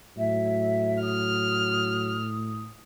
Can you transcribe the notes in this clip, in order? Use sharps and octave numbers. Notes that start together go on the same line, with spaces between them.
A2 F#3 E5
D#6 F6